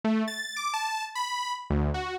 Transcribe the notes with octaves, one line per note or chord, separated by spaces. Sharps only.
A3
A6
D6
A5
B5
D2
F#4